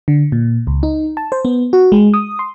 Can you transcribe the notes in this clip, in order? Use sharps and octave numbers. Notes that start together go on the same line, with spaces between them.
D3
A#2
C#2
D#4
A5
C5
B3
F#4
G#3
D#6
C6